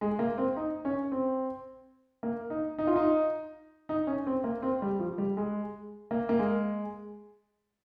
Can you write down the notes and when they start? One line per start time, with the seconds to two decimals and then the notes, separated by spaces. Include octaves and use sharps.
0.01 G#3
0.19 A#3
0.38 C4
0.57 D#4
0.85 C#4
1.12 C4
2.23 A#3
2.50 D#4
2.79 D#4
2.87 F4
2.96 D#4
3.89 D#4
4.07 C#4
4.27 C4
4.44 A#3
4.62 C4
4.82 G3
4.99 F3
5.18 G3
5.37 G#3
6.11 A#3
6.29 A#3
6.39 G#3